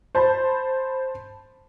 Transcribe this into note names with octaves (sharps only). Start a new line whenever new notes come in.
C5 A5 B5